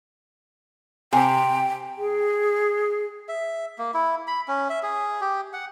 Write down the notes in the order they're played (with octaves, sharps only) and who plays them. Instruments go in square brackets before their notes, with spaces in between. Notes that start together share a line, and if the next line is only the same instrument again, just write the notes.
[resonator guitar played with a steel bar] C3 [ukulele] C5 G#5 [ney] G5
[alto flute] G#4
[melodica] E5
A#3
E4
B5
C#4
E5
G#4
G4
F#5